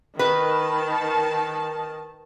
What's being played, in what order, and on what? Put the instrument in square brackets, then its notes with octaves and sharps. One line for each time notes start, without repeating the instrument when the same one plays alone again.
[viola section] D#3 A5 [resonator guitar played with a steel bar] B4